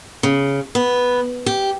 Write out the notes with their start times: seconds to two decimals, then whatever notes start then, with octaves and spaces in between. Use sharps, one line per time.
0.23 C#3
0.75 B3
1.46 G4